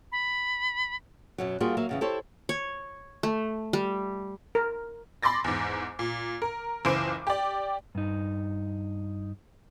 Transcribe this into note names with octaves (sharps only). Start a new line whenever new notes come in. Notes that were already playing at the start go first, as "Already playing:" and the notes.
B5
F#2 B2 F#3
G3 A#3 F4 F#4 G#4
F#3 A#3 E5
E2 C#3 E3
E4 G4 A4 C5 C#5
C#5
A3
G3
A#4
B5 C6 D6 A6 A#6
E2 G#2
A#2
A#4
F#1 C#2 E3 C5 D6 D7
G4 D5
G2 D#4